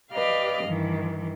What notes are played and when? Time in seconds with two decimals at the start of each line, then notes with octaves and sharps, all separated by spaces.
0.12 G4 B4 D5 D#5 F5 F6
0.64 G2 D#3 E3